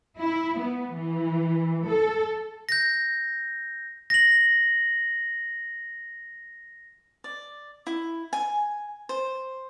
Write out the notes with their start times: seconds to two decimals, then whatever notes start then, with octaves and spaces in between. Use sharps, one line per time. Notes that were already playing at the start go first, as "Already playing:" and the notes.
0.18 E4
0.59 B3
0.95 E3
1.88 A4
2.69 G6 A#6
4.10 A#6 F#7
7.24 D5
7.87 E4
8.33 G#5
9.09 C5